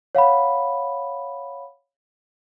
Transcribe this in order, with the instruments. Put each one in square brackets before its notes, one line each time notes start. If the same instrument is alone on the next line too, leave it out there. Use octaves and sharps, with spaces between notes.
[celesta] C#5 F5 F#5 B5